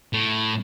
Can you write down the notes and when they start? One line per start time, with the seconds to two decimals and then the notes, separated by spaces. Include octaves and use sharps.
0.13 A2